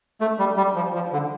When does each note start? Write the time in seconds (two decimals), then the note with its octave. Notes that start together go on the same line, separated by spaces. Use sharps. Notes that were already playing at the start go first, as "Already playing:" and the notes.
0.21 A3
0.39 G3
0.57 G3
0.76 F3
0.94 F3
1.12 D3